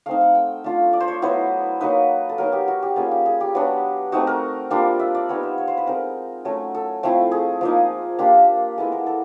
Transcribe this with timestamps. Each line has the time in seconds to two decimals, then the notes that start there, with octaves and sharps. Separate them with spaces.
0.06 A3 C4 D#4 F5
0.21 F#5
0.35 G5
0.64 A3 D4 F4
0.93 D5
1.00 C5
1.08 C#5
1.22 F#3 B3 E4 C5
1.81 F#3 A#3 D#4 B4
2.29 A4
2.38 F#3 B3 D#4 A#4
2.52 G4
2.68 F#4
2.83 G4
2.96 G3 A#3 C#4 F4 G#4
3.11 G4
3.26 G#4
3.41 G4
3.55 F#3 B3 D4
4.12 A3 C4 D#4 F#4
4.27 A#4
4.71 G3 A#3 D4 F4
5.00 E5
5.15 D5
5.29 G3 B3 D#4 C#5
5.43 C5
5.58 C#5
5.67 C5
5.77 B4
5.87 G#3 C4 D#4 A#4
6.45 F#3 A3 C#4
6.75 A4
7.03 F3 A3 C4 E4
7.31 G#4
7.61 F3 A#3 D#4
8.18 A#3 D4 F4 G4
8.78 G#3 B3 E4 A4
8.92 A#4
9.07 A4